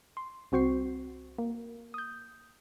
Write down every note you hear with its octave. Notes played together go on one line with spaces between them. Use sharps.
C6
C2 C4 F#4 C5 C#6 C7
A#3
D#6 G6